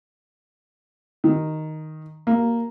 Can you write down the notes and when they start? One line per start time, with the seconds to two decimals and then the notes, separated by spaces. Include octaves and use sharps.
1.24 D#3
2.27 A#3